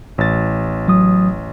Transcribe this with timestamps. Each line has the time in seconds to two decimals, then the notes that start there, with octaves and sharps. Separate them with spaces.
0.18 A1 A6
0.88 F#3 D#6